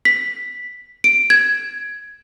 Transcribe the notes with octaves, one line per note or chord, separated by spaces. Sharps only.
B6
D7
G#6